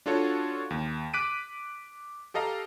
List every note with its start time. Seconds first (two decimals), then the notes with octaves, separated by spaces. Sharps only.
0.06 D4 F4 F#4 A4 C#5
0.70 D#2
1.14 D6 F#6 B6 D7 D#7
2.34 G4 A4 D#5 F5 A#5